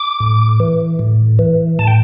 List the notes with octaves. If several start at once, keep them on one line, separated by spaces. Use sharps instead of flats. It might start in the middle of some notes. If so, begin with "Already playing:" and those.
Already playing: D6
A2
E3
A2
E3
A2 A5
G5